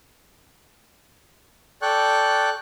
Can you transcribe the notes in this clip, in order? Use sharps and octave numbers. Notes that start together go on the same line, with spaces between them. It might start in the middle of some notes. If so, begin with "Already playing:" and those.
A4 D5 G5 C#6 F#6